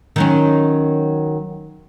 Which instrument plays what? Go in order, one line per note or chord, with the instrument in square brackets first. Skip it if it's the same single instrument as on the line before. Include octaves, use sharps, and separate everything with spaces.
[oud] D#3 F#3 C#4